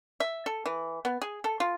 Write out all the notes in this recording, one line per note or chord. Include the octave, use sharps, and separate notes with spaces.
E5
A4
E3
B3
G#4
A4
F4